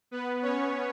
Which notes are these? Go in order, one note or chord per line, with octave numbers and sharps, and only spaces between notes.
B3 B4
C#4 C#5